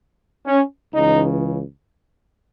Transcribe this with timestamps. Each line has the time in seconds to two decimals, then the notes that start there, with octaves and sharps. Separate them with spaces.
0.46 C#4
0.93 C#2 C#3 E3 D#4